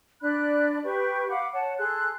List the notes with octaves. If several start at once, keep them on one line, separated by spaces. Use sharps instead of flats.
D4 D5 B5 F#6
G4 B4 C#6
F5 F#5 B5 D6
C#5 F#5 A5
G#4 A4 C6 F#6